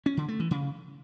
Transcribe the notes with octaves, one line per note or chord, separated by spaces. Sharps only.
C#4
D3
A3
E3
C#3